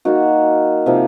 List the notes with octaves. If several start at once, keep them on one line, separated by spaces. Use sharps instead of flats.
D#3 A#3 D#4 F#4
C3 F3 A#3 D#4